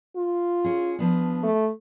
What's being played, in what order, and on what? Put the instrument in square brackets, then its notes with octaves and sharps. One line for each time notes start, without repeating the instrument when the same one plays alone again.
[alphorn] F4
[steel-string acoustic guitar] C#4 G#4
F3 B3 D4
[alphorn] A3